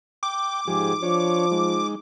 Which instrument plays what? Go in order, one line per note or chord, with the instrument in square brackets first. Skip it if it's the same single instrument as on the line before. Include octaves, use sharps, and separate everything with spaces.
[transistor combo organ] G5 [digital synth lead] D6
[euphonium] G#2 [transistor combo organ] F3 G4 G#4
[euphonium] F3 [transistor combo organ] D4 C#5
[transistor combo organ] G#3 D#4